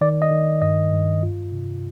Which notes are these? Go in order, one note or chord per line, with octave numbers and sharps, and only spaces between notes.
D#3 D5
D#5
D#3
G2 D#5
G2
F4
C3